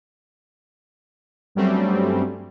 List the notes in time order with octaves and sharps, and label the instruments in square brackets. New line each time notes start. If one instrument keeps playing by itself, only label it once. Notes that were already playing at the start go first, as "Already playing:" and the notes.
[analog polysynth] G2 F#3 G3 A3 C4 C#4